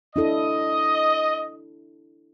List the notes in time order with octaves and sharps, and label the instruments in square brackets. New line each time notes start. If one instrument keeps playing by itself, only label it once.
[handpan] D4 E4 A4 [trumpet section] D#5